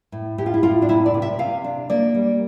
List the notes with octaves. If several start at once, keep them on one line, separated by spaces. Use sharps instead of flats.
A2
A2 G4
F4
E4
A2 F4
D4
C3 E4
D5
C3
E5
C3 F5
D4
A#3 D5
G3